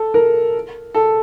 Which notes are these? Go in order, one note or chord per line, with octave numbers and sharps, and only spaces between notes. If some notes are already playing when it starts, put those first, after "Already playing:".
Already playing: A4
A#4
A4